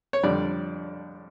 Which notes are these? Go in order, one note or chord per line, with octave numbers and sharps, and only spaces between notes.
C#5
F2 D3 G3 D5